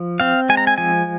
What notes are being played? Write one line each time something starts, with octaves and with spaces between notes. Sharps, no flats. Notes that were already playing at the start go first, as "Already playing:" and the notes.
Already playing: F3
C4 F5
G#3 G#5
A#5
G#5
F3 G#5